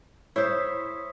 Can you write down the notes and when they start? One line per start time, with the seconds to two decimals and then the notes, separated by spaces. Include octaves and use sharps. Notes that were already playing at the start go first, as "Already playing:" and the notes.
0.36 E4 C5 C#5 C#6 D#6 B6